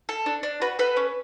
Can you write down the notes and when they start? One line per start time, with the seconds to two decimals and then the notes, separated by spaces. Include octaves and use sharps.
0.09 A4
0.26 D4
0.43 D4
0.62 F#4 B4
0.79 A4 B4
0.97 C#4